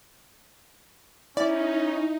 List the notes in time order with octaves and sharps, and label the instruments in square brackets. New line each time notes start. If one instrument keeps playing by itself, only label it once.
[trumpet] C#4 [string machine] D#4 [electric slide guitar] E4 [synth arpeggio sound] D5